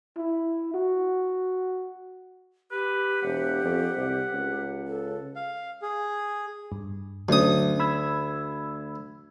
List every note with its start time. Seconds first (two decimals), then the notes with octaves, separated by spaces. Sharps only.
0.17 E4
0.74 F#4
2.71 G4 B4
3.22 E1 F#5
3.64 F2
3.97 C2
4.33 C#2
4.87 A4
5.36 F5
5.82 G#4
6.72 G2
7.29 D2 F#3 C#4 D#6
7.80 B5 E6 G#6